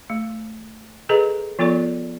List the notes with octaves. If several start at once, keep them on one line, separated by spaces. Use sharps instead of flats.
A3
G#4 A4 B4 D#5 A#5
F3 B3 F4 A4 D5